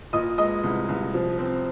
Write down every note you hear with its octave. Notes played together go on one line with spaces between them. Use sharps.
A#2 D#5 D#6
G#3 D#5 D#6
C2
C2
F3
C4